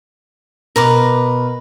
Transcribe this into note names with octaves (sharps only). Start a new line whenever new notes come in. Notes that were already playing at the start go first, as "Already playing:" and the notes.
B2 A#4 B4 D6